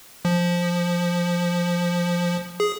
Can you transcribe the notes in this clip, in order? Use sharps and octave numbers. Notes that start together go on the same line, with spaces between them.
F3
G#4